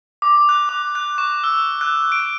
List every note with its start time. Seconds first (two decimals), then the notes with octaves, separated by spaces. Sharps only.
0.22 D6
0.49 F#6
0.69 D6
0.95 F#6
1.18 C#6
1.44 E6
1.81 F#6
2.12 D7